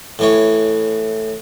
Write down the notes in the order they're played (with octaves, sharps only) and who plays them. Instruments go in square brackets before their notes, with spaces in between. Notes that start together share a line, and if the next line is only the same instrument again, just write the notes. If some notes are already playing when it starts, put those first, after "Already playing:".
[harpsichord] A2 E3 C#5